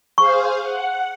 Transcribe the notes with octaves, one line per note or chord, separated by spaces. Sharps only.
G#4 C5 F5 C#6
F#5